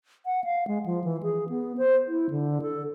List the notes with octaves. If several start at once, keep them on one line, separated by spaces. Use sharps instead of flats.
F#5
F5
G#3
F3
E3
G#4
B3
C5
E4
D3
A4